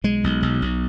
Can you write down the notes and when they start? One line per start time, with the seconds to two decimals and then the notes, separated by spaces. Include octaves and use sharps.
0.04 B1 G#3
0.24 B1
0.42 B1
0.62 B1